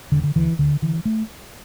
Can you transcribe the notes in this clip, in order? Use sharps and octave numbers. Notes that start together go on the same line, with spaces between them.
E1 D3
D3
D2 D3 E3
D2 D3
D3 E3
A3